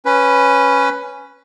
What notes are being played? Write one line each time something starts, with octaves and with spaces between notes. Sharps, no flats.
C#4 B4